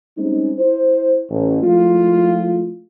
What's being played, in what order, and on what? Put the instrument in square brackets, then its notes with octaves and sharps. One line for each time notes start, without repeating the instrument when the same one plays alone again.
[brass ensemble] G3 G#3 C4 C#4 D#4
E4 C5
A1
F3 G#3 A3 E4 F4